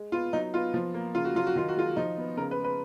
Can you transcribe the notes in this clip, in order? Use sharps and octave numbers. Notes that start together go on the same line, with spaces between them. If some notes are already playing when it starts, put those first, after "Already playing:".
Already playing: G#3
B3 F4
F#3 D#4
B3 F4
F3
A#3
C#3 F4
F#4
F#3 F4
F#4
D#3 F4
F#4
G#3 F4
F3 D#4
B3
C#3 A#4
B4
G#3
B4